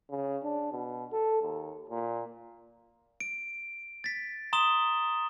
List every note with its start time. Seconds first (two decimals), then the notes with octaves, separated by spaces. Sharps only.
0.10 C#3
0.43 D4
0.72 B2
1.12 A4
1.42 D#2
1.89 A#2
3.20 D7
4.04 A6 B6
4.53 A#5 C6 D#6 E7 G7